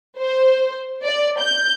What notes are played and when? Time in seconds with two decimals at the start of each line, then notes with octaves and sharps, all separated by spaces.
0.19 C5
1.03 D5
1.39 G6